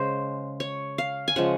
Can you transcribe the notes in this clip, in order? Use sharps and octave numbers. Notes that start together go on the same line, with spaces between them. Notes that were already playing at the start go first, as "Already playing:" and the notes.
Already playing: C#3 G#3 C5
C#5
F5
G#5
C#3 F3 G#3 F#5